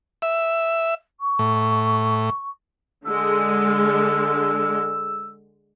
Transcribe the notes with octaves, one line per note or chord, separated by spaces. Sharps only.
E5
C#6
A2
D3 G#3 E6